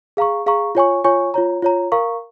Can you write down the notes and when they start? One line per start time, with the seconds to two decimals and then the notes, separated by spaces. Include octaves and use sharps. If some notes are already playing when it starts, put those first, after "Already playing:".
0.17 G#4 F5 A#5 C#6
0.46 G#4 F5 A#5 C#6
0.75 F4 C#5 G#5 C#6
1.04 F4 C#5 G#5 C#6
1.34 F4 C#5 A#5
1.62 F4 C#5 A#5
1.92 A#4 F5 A#5 C#6